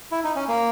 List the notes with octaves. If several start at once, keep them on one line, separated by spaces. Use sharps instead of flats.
E4
D#4
C#4
A#3